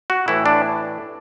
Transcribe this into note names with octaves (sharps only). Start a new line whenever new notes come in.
F#4
A2 E3 E4
D4